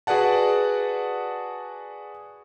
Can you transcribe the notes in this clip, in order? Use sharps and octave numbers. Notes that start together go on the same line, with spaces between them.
F#4 G#4 B4 D5 F#5 A5